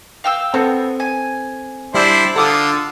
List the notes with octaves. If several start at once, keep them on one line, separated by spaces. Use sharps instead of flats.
F5 G5 E6
B3 C4 A4
G#5
G3 D4 E4 C5
D3 F4 A4 F#5 D6 D#6